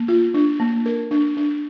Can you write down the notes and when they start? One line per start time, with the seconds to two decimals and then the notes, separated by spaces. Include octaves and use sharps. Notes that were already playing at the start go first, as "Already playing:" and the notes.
Already playing: A#3
0.08 F4
0.34 D4
0.60 A#3
0.86 A#4
1.11 D4
1.37 D4